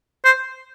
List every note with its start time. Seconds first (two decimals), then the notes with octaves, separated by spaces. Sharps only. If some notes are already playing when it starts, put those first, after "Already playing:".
0.25 C5